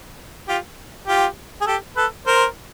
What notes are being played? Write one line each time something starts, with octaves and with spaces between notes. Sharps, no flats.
F4 G4
F4 G4
G#4
G4 A4
A4 B4
A#4 C5